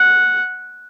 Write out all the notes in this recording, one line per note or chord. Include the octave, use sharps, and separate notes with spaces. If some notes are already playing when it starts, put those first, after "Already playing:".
Already playing: F#5